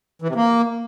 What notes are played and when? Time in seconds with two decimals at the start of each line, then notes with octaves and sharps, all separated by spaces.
0.22 E3
0.29 C3
0.35 A#3